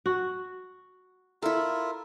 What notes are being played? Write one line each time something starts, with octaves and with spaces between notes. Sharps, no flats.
F#4
E4 F4 A4 A#4 E5